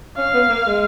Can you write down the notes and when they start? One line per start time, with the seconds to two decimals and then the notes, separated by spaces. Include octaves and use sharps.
0.17 C#4 F5
0.34 B3
0.50 A#3
0.67 G#3